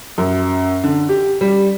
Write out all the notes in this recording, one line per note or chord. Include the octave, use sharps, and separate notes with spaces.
F#2
D3
G4
G3